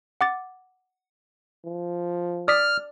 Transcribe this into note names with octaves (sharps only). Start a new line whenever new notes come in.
F#5 D6 A6
F3
D5 D#6 F6 B6